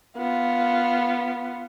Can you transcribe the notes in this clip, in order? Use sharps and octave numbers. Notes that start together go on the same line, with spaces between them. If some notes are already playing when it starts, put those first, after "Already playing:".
B3 F4